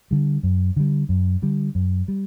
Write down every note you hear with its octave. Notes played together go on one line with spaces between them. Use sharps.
D3 G3
F#2
D3 G3
F#2
D3 G3
F#2
G3